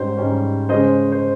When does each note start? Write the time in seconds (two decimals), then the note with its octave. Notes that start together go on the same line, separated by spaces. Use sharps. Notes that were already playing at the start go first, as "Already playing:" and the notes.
Already playing: G#2 G3 C#4 C5
0.17 G#2 G3 C#4
0.69 C#3 G#3 C#4 C5 D#5
1.12 C5